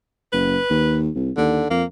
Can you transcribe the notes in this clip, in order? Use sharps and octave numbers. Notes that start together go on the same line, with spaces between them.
F#1 B4
D#2
C2
D#2 D3
F2 A#3